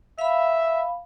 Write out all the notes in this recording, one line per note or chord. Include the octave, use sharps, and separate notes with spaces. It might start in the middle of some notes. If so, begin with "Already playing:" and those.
E5 F5 B5